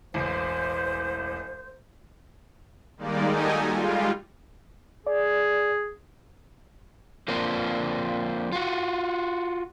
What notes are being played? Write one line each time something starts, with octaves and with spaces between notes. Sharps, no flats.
E1 A1 C5
D#3 G3 G#3 A#3 D#4 D5
D#4 F#4 G4 A4 D#5 G#5
G3 G#3 F4
G#4 D5
F3 A#3 C4 D4
F4 F#4